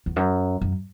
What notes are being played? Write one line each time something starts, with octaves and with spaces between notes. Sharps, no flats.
E2
F#2
F#2